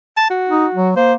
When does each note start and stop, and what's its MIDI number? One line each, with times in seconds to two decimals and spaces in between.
0.17 0.27 81
0.30 0.90 66
0.49 0.66 63
0.74 0.92 54
0.96 1.15 58
0.96 1.13 72